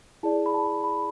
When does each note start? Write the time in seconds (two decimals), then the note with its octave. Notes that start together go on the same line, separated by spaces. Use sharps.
0.23 E4 G#4 D5 A5
0.46 B5
0.54 A5
0.84 B5